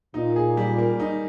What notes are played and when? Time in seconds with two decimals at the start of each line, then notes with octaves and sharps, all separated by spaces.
0.14 A#2 D#4
0.36 G#4
0.57 G3
0.78 A#3
1.00 D#4